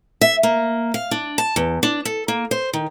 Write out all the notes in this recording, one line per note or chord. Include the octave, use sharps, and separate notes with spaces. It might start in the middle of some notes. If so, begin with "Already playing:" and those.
E5
A#3
F5
D4
A5
E2
D4
A4
A#3
C5
D#3